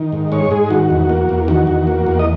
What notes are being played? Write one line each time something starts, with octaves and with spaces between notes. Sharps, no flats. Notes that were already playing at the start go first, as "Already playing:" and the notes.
Already playing: D#3
G#2
G#3 C#5
G#2 G#4
D#3 F#4
E2
A#3
E2
D#3 F#4
E2
A#3
E2
D#5